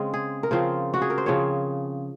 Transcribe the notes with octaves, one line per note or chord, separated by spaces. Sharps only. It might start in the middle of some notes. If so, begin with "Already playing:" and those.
Already playing: C#3 G#3 C4
G#4
A#4
C#3 F3 C4 C5
F#4
G#4
A#4
C5
C#3 F3 C4 C#5